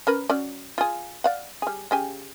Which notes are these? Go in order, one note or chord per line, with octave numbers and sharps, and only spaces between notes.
C#4 A#4 B4
F#3 C#4 D5
F4 G#4
D5 F5 F#5
G3 G#4
C#3 G4 G#5